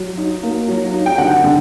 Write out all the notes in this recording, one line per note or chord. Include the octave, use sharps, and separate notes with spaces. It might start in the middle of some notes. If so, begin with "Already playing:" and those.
Already playing: F#3
D#4
A#3
F#3
D#4
G5
D3 F#5
D3